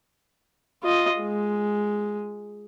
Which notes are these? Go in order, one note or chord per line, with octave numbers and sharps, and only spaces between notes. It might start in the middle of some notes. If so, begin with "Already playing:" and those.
F4 D#5
G#3